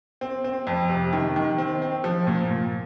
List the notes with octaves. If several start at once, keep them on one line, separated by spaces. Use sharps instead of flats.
C4
C4
F2
C3
D#3
D#3
C4
C4
F3
A#2
A#2